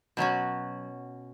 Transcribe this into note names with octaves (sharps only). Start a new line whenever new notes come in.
B2 F#3 C#4 F#4